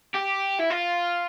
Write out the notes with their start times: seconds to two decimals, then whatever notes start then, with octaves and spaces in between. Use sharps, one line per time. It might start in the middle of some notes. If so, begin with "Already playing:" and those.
0.15 G4
0.60 E4
0.71 F4